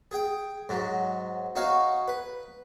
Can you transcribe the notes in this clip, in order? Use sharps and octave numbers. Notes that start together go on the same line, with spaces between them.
G#4 G5
G#2 F#3
D#4 F#4 C#5 F5
B4